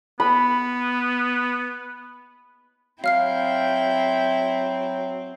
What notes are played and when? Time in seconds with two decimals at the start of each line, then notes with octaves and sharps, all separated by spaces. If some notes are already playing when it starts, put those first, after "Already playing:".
0.20 B3 B5
3.04 F#3 C4 E4 F5 G5 F6 C7